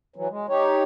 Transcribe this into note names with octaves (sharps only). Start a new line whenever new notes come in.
E3 F#3
G#3
D#4 G4 C#5